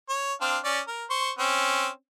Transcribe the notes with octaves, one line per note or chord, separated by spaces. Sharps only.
C#5
C4 D4 F5
C#4 D5
A#4
C5 C6 C#6
C4 C#4